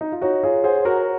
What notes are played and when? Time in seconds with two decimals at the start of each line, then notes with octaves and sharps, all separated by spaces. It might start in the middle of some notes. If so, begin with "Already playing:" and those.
0.01 D#4
0.12 F4
0.22 D#4 F#4 C#5
0.43 F4 G#4 C#5
0.64 G#4 C5 F#5
0.78 C5
0.85 F#4 A#4 A#5